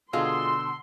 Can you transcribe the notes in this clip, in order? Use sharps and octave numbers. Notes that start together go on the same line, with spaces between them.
B2 D3 F4 G#4 D#5 C6 E6